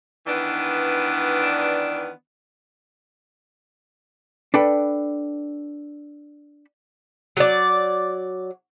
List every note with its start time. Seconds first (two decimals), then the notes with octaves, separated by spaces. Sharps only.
0.27 D#3 E3 B3 D4
4.54 D4 A4 B4 G5 B5
7.37 F#3 D5